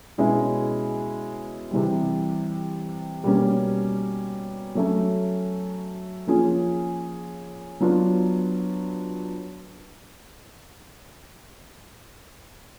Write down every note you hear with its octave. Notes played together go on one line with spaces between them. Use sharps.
B2 G#3 C#4 E4
C3 E3 G3
B2 G3 A#3 C#4
F#3 A3 C#4
F3 A#3 C#4 F4 G#4
F#3 B3 D4 F4